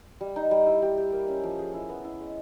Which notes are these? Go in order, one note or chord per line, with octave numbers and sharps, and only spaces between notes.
G3
D#4
G3
E4
G4
G4
A#3
C#4
F3
G#4
E4
B3
E4
G#3